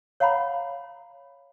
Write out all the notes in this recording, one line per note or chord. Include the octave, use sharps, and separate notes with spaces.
C#5 F5 F#5 A#5 B5